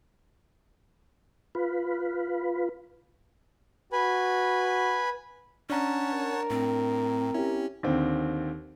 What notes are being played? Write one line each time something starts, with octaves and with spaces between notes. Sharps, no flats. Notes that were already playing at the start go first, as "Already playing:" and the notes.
F4 B4
F#4 B4 G#5 B5
C#4 D4 C#5 F#5 A5 A#5
A#4
A2 C4
C#4 E4 G4
D#2 D3 C4